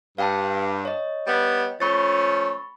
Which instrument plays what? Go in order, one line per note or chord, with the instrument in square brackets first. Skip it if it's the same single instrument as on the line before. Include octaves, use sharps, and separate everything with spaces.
[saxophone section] G2 [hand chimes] F5 G5 A5
[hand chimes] C#5 D#5
[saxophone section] G3 B3
[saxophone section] F3 A3 C#4 [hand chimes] B5 C#6 A6